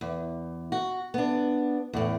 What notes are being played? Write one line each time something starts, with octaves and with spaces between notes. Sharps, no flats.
E2
F#4
B3 D4
E2 A2